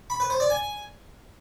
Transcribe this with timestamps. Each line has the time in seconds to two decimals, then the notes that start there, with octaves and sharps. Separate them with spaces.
0.10 B5
0.20 B4
0.30 C5
0.40 D5
0.50 G#5